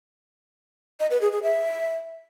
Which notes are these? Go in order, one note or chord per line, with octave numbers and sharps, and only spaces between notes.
D#5
B4
G#4
G#4
E5